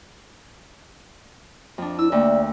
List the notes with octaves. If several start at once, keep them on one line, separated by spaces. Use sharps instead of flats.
F2 D4
E4 E6
D2 A#3 D5 G5